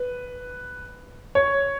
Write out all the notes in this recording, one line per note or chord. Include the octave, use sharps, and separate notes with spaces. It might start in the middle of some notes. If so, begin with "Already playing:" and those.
Already playing: B4
C#5